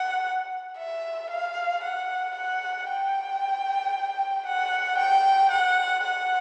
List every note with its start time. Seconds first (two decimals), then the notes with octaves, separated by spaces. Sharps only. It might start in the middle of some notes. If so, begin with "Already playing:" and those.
Already playing: F#5
0.78 E5
1.31 F5
1.84 F#5
2.36 F#5
2.89 G5
4.46 F#5
4.98 G5
5.52 F#5
6.04 F#5